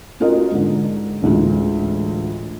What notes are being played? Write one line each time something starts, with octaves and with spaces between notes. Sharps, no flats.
C#4 F4 F#4 A#4 D#5
G#2 D3
A1 D2 G#3 F4